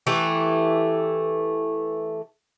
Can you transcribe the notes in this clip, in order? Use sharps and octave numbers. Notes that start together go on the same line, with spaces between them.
E3 A3 G4